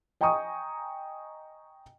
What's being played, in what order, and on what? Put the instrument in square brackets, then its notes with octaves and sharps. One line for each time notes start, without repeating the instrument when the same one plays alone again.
[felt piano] D#5 G5 G#5 A#5 C#6 D#6